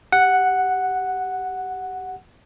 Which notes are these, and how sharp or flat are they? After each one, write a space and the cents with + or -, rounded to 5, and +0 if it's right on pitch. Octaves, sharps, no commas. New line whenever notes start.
G4 +0 F#5 +0